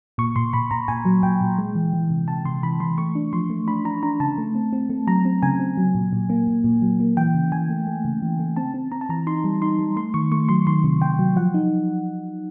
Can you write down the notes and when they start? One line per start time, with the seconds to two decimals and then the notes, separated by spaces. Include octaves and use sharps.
0.18 A#2 C#6
0.36 A#2 C6
0.53 A#2 B5
0.71 A#2 A#5
0.88 A#2 G#5
1.05 F#3
1.23 A#2 G5
1.41 A#2
1.58 G#3
1.75 E3
1.93 E3
2.10 C3
2.28 C3 A5
2.45 C3 C6
2.63 E3 B5
2.80 E3 C6
2.98 A3 C#6
3.15 D4
3.33 F3 C6
3.50 A3
3.68 D4 B5
3.85 D4 A#5
4.03 D4 A#5
4.20 C#3 A5
4.38 A3
4.55 C4
4.73 C4
4.90 A3
5.07 F#3 A#5
5.25 C4
5.43 C#3 G#5
5.60 C4
5.77 F#3
5.95 A#2
6.13 A#2
6.30 A#3
6.47 A#2
6.64 A#2
6.82 F#3
7.00 A#3
7.17 E3 G5
7.34 C#3
7.52 E3 G#5
7.70 A3
7.87 A3
8.05 C#3
8.22 E3
8.40 A3
8.56 C4 A5
8.74 C4
8.92 C4 A#5
9.01 A5
9.09 E3 A#5
9.27 D#4 C6
9.44 G3
9.62 D#4 C6
9.79 G3
9.96 A3 C6
10.14 D#3 C#6
10.32 A3 C#6
10.49 F#3 C6
10.67 D#3 C6
10.84 C3
11.01 C3 G5
11.19 F#3
11.36 F3 F#5
11.54 D#4